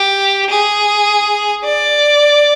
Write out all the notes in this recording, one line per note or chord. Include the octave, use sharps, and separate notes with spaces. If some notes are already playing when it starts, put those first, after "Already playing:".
Already playing: G4
G#4
D5